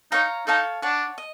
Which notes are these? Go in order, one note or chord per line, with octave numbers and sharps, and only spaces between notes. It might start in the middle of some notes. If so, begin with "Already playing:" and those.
D#4 C#5 F5 A#5
D#4 A4 C#5 F5 A5
D4 C#5 F#5 A5
D#5